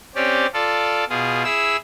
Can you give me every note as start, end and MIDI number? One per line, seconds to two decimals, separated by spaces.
0.15 0.46 60
0.15 0.46 61
0.15 0.46 67
0.15 0.46 74
0.54 1.04 65
0.54 1.04 69
0.54 1.04 74
1.09 1.44 47
1.09 1.44 65
1.09 1.44 68
1.44 1.77 64
1.44 1.77 68
1.44 1.77 88